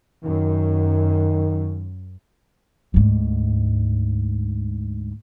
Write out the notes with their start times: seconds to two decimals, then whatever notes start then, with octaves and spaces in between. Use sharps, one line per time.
0.24 F#2 D#3
2.94 D2 G#2